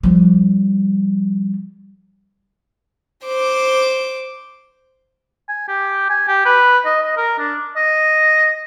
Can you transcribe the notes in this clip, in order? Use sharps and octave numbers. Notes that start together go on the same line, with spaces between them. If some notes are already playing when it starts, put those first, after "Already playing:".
F3 G3
C5 D6
G#5
G4
G#5
G4
B4
D#5
D#5
A#4
D4
D#5